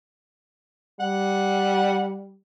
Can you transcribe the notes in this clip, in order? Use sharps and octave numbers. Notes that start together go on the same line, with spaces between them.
G3 F#5